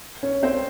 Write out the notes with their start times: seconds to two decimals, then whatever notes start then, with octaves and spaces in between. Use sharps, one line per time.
0.23 C#4 C#5
0.43 C4 C5